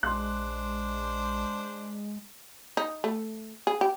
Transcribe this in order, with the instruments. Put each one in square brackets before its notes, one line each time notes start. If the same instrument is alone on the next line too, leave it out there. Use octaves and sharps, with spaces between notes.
[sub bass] A#1 [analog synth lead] G#3 [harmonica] D4 C5 [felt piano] C6 F#6
[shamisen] D#4
A3
G#4
G4